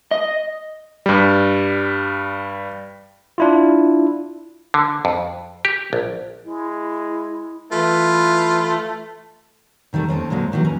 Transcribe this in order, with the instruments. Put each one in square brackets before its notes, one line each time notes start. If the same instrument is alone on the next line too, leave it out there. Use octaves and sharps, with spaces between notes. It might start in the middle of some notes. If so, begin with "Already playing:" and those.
[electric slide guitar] D#5
[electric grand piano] G2 G3
[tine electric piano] D4 E4 F4
[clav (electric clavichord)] D3
F2
G4
A#1
[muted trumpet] G#3 [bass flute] E4
[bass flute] E3 [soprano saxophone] A3 [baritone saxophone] F4 [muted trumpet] B4
[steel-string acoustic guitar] C3 D#3 G3 A3
D#2 A3 C4 C#4
A#2 D3 F#3 G#3 C4
A#2 D#3 E3 F#3 G3
D#2 C#4 A#5